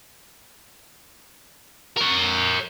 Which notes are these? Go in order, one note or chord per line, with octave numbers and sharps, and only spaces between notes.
A#4 C#5